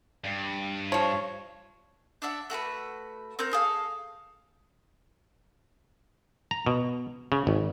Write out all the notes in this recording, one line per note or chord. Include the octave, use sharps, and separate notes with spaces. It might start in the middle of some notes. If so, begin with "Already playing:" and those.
G2
F3 C#5
D4 D5 E5 F#5
A3 F#4 A4 B4
C4 A#4 F#5 G6
G#4 A4 F5
A#5
B2
C#3
G#1